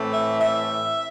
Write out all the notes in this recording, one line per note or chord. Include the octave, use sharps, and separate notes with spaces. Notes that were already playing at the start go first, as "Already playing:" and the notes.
Already playing: A2 E3 A3 C4
E5
E5